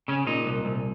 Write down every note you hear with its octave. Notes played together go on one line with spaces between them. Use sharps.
C#3 C#4
A#2 D#4
C2
C2